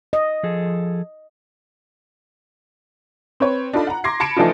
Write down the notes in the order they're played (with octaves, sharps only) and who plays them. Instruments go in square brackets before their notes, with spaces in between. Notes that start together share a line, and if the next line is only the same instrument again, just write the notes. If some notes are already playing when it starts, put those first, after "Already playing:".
[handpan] D#5
[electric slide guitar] F3 G#4 A4
[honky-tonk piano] C4 B4 C#5
D4 D#4 F4 A4 B5
F#5 A#5
A#5 C6 D6 G#6 A#6 C7
A5 B5 G#6 C#7 D7 E7
E3 F3 A3 D4 D#4 F4